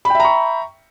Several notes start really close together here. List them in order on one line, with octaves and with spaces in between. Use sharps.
B5 G5 E5 A#5 C#6